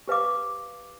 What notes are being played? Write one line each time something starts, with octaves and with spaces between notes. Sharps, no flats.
G4 B4 F5 D6